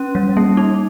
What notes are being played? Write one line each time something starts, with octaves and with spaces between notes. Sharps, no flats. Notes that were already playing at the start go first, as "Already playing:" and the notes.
Already playing: C#4
G3
A#3
D#4